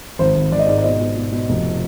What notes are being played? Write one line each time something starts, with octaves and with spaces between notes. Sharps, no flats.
G#1 C5
G#1
G#1 D5
D#5
G#2 D5
D5
B2 D#5
B2
B2
B2
F1